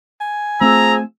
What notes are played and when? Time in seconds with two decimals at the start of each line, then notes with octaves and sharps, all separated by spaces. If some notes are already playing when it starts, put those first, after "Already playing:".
0.21 G#5
0.61 F3 A3 C4 G#4 A#5 E6